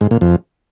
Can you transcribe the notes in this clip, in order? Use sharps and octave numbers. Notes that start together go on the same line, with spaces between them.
G#2
A#2
F2